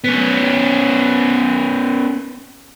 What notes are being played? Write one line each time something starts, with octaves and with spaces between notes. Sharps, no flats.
B3 C#4